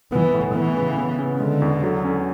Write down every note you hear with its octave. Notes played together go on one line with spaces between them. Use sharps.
E3 B3
A2
E3 B3
C#3
B3
C#3
D3 G#3
E2
F#3
C#4